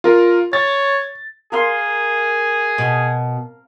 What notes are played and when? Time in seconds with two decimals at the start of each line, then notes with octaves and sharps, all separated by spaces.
0.04 F4 A#4
0.53 C#5 A6
1.52 G#4 A#4 F5 C6
2.78 B2